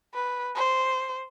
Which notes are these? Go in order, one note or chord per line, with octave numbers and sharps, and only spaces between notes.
B4
C5